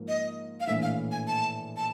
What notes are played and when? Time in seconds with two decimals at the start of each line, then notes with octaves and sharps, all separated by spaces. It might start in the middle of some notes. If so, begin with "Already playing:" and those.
Already playing: G#2 F3 A#3
0.08 D#5
0.60 F5
0.67 A#1 A2 E3 E5
0.82 F5
1.12 G#5
1.27 A5
1.76 A5